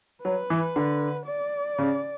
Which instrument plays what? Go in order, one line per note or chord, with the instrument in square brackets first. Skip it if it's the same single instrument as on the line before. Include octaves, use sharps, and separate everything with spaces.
[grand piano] F#3 [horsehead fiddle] B4
[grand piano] E3
D3
[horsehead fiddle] D5
[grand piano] C#3